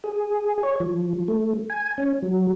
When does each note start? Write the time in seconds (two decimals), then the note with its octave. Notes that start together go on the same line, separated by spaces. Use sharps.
0.04 G#4
0.63 C#5
0.80 F3
1.28 A3
1.70 G#5
1.98 C#4
2.22 F#3